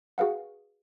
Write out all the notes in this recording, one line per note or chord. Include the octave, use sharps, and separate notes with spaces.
F#4 G#4 B4 F5 F#5